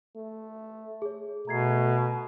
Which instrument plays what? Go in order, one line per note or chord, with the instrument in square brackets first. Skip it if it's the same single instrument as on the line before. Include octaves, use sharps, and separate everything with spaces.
[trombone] A3
[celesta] G#4 C#5
[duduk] B2 [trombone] A3 [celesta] A#5 G#6 C7